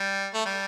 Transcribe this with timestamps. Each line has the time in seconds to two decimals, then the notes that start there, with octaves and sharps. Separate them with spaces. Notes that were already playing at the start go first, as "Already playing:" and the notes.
Already playing: G3
0.34 A3
0.45 G3